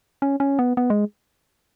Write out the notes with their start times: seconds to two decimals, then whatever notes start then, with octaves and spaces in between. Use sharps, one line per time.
0.22 C#4
0.40 C#4
0.59 B3
0.77 B3
0.90 G#3